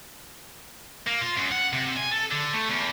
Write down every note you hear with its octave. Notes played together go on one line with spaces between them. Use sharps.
A#3
F4
F#2
F#5
C3
G#5
A4
D3
A3
E2